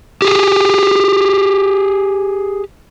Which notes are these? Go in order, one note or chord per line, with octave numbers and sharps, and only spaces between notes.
G4 G#4